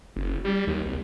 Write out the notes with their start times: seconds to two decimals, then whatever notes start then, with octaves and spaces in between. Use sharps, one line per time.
0.16 F#1
0.45 G3
0.67 D#2
0.85 C2